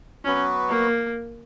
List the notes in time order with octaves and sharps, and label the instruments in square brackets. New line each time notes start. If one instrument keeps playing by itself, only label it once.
[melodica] F#3 B3 F#4 B4 [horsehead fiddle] C#4
[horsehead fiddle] A#3